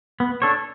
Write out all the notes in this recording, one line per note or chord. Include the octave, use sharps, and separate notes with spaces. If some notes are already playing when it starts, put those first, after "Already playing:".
B3
D4 A4 C#5